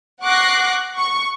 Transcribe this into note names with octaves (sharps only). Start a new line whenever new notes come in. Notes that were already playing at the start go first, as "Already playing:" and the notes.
F#5 C#6 D6 F#6 A#6 C7
C#6